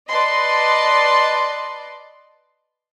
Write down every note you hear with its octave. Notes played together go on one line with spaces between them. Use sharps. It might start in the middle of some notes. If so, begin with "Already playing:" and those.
B4 D5 D#5 A5 C6